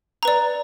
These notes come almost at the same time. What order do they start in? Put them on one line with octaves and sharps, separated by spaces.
A#5 B4 D5